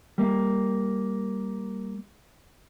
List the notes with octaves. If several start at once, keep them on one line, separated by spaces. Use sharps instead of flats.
G3 A#3